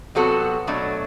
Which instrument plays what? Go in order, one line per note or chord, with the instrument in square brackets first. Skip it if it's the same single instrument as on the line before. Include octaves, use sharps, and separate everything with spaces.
[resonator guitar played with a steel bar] C3 F#3 B3 F#4 A4
B2 F#3 A3 D4